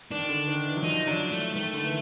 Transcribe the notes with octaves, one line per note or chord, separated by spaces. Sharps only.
D#3 D4
D3
D#3
E3
F#3
F3 D#4
F#3 D4
A3
D#3 A3
D3
E3